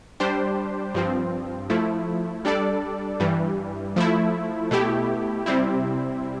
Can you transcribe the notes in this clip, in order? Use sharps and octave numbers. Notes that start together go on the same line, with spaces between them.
G3 D4 G4 C5
G2 F3 C4
F3 A3 E4
G3 D4 A4 D5
G2 E3 G3
F3 A3 E4
B2 A3 E4 G4
C3 G3 C4 E4